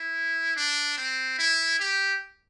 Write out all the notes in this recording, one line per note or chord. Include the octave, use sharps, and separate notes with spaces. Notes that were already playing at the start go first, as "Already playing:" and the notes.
Already playing: E4
D4
C4
E4
G4